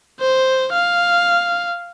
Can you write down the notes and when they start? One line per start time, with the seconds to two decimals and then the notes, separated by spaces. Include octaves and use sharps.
0.21 C5
0.73 F5